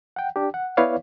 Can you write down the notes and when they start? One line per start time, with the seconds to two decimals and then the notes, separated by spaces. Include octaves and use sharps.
0.16 F#5 G5
0.36 D4 G4
0.54 F#5
0.77 B3 E4 B4 C#5 D5 F5